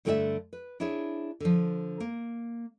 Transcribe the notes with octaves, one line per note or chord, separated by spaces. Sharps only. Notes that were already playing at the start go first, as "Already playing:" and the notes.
G2 D3 A3 G4 D5 E5
B4
D4 E4 G#4 C#5
D3 F3
A#3